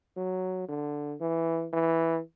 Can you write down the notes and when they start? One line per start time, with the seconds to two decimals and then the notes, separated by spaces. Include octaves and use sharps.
0.17 F#3
0.68 D3
1.21 E3
1.73 E3